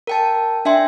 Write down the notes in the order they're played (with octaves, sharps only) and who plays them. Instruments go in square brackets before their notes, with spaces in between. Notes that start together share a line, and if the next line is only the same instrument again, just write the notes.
[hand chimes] A#4 G5 A5
D4 E5 G5 G#5 C6